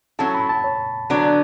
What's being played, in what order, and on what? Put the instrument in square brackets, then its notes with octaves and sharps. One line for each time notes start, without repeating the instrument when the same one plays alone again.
[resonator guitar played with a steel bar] F#3 C#4 E4 A4 [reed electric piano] A5
[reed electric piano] B5
A5
C#5
[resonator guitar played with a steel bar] D3 F#3 B3 D4 [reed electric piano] D5